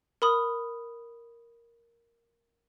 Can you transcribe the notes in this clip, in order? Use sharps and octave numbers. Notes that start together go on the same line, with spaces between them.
A#4 B5 D#6